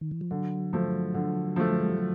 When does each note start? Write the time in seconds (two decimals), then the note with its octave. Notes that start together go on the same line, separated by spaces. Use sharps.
0.01 D#3
0.11 E3
0.21 F3
0.31 D3 F#3
0.73 F3 A3
1.14 D3
1.56 F3 A3
1.71 A3
1.80 G#3
1.89 G3
1.98 F#3